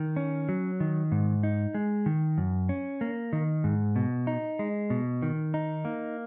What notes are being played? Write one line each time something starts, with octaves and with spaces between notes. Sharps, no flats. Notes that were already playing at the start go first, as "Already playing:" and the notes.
Already playing: D#3
C#4
F#3
D#3
G#2
D#4
G#3
D#3
F#2
C#4
A#3
D#3
G#2
B2
D#4
G#3
B2
D#3
D#4
A#3